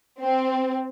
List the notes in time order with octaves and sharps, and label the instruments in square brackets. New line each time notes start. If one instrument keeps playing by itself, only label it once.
[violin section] C4